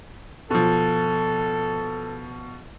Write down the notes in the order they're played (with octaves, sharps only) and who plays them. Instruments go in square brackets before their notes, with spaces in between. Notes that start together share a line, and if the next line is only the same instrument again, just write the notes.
[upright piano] B2 F3 [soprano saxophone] A4